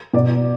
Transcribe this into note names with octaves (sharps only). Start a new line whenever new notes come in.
B2 D5